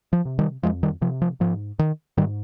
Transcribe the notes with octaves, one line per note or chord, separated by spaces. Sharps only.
F3
C3
D#3 G3
F2 F3 G#3
D#3 G3
C3 F3
F3
G#2 F3
D#3
G#2 D#3 G3